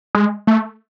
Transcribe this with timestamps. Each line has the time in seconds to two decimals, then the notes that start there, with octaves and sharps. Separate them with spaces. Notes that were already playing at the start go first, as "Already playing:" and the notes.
0.15 G#3
0.47 A3